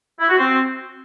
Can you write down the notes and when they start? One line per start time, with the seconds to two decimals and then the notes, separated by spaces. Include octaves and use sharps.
0.20 E4
0.29 F#4
0.38 C4